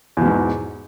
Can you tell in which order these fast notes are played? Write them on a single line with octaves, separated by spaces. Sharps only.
E2 B2 G#2